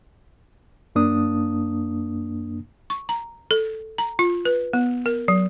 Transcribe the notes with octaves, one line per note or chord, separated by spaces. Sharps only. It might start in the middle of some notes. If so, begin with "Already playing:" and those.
F#2 A#3 D4 D#6
C#6
A#5
A4
A#5
F4
B4
B3
A#4
F#3